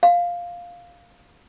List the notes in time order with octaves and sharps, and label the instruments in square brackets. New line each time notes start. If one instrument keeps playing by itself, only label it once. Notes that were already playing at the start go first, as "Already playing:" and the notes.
[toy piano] F5